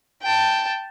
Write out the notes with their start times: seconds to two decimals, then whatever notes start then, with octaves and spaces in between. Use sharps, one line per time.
0.22 G5 A5